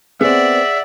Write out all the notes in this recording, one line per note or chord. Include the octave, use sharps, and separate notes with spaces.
B3 C4 G#4 D5 E5 F#5